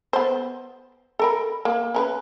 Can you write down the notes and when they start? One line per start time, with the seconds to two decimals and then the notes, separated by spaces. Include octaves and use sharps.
0.13 B3 C5
1.19 A4 A#4 B5
1.65 A#3
1.94 C#4 A#4 B4